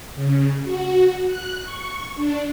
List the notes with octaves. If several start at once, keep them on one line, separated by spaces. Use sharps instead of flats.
C#3
F#4
F#6
C#6
D4